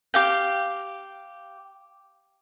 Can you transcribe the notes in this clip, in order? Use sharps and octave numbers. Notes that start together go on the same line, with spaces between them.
G4 F5 G5